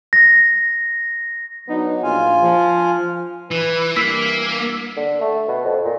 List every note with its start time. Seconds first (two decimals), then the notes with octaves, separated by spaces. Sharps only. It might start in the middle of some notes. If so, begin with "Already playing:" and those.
0.13 A#6
1.68 F#3 B3 D4 D#4
2.03 A#1 F4 F5 G#5
2.42 F3
3.51 E3 B4
3.96 G2 E3 A#3 E6 B6
4.96 D3
5.21 A3
5.48 B2
5.64 F2
5.84 A#2